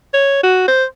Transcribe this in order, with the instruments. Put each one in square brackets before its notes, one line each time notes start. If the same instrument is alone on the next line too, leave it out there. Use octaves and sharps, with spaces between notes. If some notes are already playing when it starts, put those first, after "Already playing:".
[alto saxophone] C#5
F#4
C5